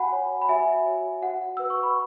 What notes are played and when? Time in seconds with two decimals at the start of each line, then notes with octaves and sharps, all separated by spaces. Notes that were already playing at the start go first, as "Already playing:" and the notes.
Already playing: F#4 F#5 G#5 B5
0.12 C#5
0.42 B5
0.49 F#4 E5 G#5
0.86 C#5
1.22 F#4 F#5
1.57 B4 E6
1.70 C#6
1.83 B5